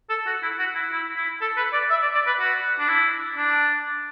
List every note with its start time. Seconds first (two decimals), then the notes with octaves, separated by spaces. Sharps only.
0.10 A4
0.27 F#4
0.43 E4
0.59 F#4
0.75 E4
0.92 E4
1.17 E4
1.41 A4
1.57 B4
1.73 D5
1.90 E5
2.02 D5
2.15 D5
2.27 B4
2.39 F#4
2.79 D4
2.88 E4
3.37 D4